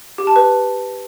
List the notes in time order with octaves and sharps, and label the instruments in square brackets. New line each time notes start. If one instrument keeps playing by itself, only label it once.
[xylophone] G4
A5
B4